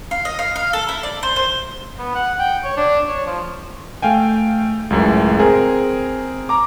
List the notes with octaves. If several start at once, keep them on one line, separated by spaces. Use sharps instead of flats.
F5
D#5
F5
F5
A4
E4
D5
C5
C5
B3
F#5
G5
C#5
D4
C#5
F3
A3 F5 G5 G#5
C#2 F#2 A2
C4 G#4 A#4
A#5 D6